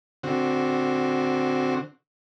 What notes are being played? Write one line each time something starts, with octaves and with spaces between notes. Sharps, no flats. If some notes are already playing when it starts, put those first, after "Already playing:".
D3 C4 F#4